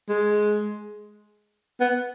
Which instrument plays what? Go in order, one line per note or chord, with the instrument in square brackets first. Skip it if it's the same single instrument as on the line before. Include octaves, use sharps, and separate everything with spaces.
[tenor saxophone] G#3
B3